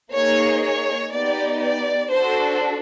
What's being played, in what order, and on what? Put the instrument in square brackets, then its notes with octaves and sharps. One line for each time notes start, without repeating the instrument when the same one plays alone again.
[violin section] A#3 D#4 G#4 C#5
C#5
B3 D#4 G4 D5
D5
D4 F#4 A4 C5